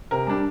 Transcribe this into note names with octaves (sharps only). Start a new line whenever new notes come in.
C3 A#4
G3 D4